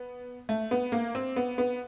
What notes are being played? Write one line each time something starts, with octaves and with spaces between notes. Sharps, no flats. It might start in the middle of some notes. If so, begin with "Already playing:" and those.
Already playing: B3
A3
B3
A#3
C4
B3
B3